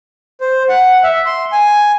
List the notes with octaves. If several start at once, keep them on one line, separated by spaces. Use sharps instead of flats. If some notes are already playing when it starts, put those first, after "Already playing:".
C5
F#5
E5
C6
G#5